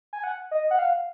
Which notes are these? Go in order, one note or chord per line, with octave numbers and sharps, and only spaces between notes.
G#5
F#5
D#5
F#5
F5